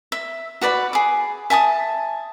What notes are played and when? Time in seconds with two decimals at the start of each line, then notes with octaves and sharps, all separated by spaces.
0.12 E5
0.62 F#4 B4 D5 B5
0.93 G#4 D6
1.50 E5 G#5 A5 D#6